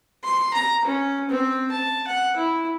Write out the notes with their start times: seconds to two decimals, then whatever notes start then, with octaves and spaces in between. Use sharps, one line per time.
0.24 C6
0.53 A#5
0.85 C#4
1.29 C4
1.71 A5
2.07 F#5
2.37 E4